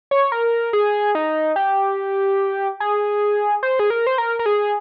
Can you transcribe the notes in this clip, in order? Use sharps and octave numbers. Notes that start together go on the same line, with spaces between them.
C#5
A#4
G#4
D#4
G4
G#4
C5
G#4
A#4
C5
A#4
A#4
G#4